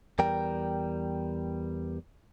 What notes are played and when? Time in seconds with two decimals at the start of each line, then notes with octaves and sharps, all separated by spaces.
0.19 E2 G3 A#4 G5